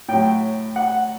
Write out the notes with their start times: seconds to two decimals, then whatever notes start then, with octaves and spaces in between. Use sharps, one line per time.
0.08 A2 F#3 G5
0.76 F#5